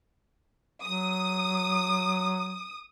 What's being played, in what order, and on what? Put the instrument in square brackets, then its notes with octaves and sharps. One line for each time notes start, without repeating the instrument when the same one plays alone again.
[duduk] F#3 [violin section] D#6